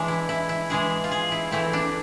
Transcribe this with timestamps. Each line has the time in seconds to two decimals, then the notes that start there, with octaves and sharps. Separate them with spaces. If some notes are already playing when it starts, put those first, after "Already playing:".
Already playing: E3 G#3 D4
0.08 E4
0.29 E4
0.49 E4
0.69 E3 G#3 D4 G#4
1.04 F4
1.11 G#4
1.32 E4
1.51 E3 A3 C4 E4
1.73 D4